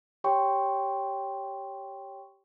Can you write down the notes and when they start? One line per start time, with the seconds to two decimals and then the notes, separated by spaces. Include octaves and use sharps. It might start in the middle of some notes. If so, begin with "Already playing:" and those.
0.24 G4 C#5 G5 C6 C#6